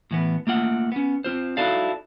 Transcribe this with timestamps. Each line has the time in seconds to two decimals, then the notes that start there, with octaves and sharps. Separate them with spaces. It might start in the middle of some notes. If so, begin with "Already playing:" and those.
0.11 A2 E3 B3
0.47 A3 A#3 F4 F#5
0.92 B3 C#4
1.24 C4 F4 C5
1.57 D#4 E4 F#4 A4 D5 F5